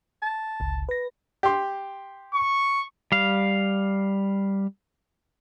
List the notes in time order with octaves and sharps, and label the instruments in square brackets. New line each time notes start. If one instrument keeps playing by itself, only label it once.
[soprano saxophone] A5
[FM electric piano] G1 C#2
B4 A#6
[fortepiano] G4 C6
[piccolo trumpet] C#6
[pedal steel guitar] G3 F5